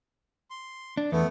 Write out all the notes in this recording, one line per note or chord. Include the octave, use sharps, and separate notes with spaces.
C6
D4
E2 A3 B3